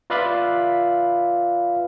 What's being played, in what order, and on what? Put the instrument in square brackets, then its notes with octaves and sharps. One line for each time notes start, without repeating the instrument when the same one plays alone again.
[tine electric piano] F4 B4 D5 E5 F5 B5